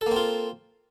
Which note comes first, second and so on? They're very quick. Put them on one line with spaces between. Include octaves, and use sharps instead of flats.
A4 A#3 C4 F4